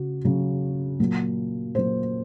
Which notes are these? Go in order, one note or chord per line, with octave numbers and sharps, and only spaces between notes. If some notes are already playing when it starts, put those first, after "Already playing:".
Already playing: C#3 F#4
C#3 F#3
A#2 F#3
A#2 F#3 C5